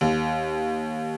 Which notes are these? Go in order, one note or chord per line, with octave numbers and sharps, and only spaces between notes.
D#2